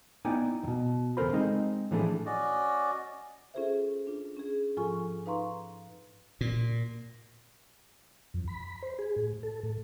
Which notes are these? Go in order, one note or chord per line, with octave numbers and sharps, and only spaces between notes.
B3 D#4 E4 D5 G5 G#5
E2 B2
E2 C#3 A4 A#4 C5 B5
G#3 C4 D#4 D#5
A2 E3 F3 A3 D4 G#4
C#4 F#4 D5 D#5
C#4 F4 G#4 A4 C5 E5
D4 F4
C#4 G#4
G#2 F3 F4 A4 G#5 C#6
D#4 B4 F5 A#5 C6 C#6
A#2
F2
B5
B5
C5
G#4
A2
A4
A2